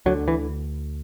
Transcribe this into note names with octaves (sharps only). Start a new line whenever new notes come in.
D2 D3 F#3
E3